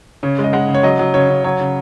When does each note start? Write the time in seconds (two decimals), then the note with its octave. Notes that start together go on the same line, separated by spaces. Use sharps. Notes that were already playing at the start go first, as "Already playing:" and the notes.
0.23 C#3 C#5
0.38 G#3
0.44 D#5
0.53 G#3 F#5
0.68 C#3
0.74 C#5
0.83 F#3 D#5
0.99 F#3
1.14 C#3 C#5
1.30 C#3
1.44 F#3 C#5
1.60 C#3